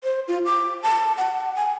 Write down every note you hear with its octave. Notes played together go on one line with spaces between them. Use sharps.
C5
F4
D6
A5
F#5
G#5